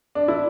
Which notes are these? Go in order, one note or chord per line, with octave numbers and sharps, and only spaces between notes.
D4
E4